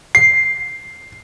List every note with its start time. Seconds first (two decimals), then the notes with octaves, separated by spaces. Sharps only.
0.15 C7